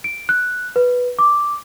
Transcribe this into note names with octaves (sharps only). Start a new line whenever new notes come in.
D7
F#6
B4
D6